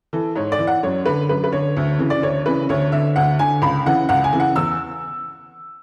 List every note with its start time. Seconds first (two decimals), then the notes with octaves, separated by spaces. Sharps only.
0.13 E3 A4
0.35 G#2 C#5
0.52 D5
0.59 E3
0.67 F#5
0.83 F#2 C#5
1.05 D3 B4
1.29 F#2 B4
1.44 B4
1.52 D3 C#5
1.77 D2
1.99 C#3 E3
2.10 D5
2.22 D2 C#5
2.46 C#3 E3 B4
2.69 D2 C#5
2.92 D3 E5
3.16 D2 F#5
3.39 D3 G#5
3.62 C#2 B5
3.86 C#3 E3 F#5
4.09 C#2 F#5
4.24 G#5
4.33 C#3 E3
4.40 F#5
4.56 E2 E6